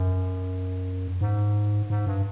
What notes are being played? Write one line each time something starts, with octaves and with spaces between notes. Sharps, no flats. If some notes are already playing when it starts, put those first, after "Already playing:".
Already playing: F#2
G#2
G#2
G2